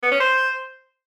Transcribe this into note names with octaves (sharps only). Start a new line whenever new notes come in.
B3
C#4
C5